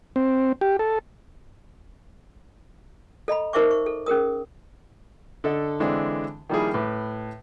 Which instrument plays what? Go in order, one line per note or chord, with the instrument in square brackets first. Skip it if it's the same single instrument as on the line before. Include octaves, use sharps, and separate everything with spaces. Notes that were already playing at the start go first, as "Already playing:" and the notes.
[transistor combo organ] C4
G4
A4
[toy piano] A4 D#5 A#5 B5
D#4 A#4 C5 E5 C#6 D6
C#6
A4
C#4 G#4 A#4 D#6
[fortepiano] D3 A4 D#5
D3 E3 G#3 C4 D4
D#3 F3 G3 A#3 E4 G#4
A2 B4 D6